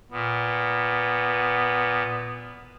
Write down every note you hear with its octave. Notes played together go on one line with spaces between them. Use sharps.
A#2 B3